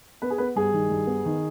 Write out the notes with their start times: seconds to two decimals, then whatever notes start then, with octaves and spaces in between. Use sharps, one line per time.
0.22 B3 B4
0.30 G#4
0.38 B3 B4
0.56 G2 G#4
0.73 D#3
0.90 G2
1.07 B3
1.25 D#3